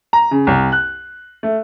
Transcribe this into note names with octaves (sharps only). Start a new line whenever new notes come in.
A#5
C#3
C2
F#6
A3